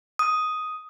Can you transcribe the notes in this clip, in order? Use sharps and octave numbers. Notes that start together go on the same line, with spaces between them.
D#6